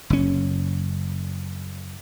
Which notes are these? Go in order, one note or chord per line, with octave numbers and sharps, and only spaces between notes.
F#1 C#4